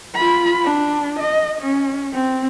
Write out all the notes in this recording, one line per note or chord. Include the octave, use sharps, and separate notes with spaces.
F4 B5
D4
D#5
C#4
C4